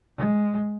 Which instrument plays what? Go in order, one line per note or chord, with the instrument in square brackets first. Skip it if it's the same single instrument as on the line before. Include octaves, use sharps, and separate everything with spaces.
[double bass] G#3